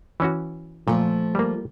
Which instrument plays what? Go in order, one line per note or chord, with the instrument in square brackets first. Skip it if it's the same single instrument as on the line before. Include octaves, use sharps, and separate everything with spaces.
[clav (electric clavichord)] E3 C#4 F#4
[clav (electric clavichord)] A#2 [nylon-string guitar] F3 A3
[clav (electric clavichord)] G3 A#3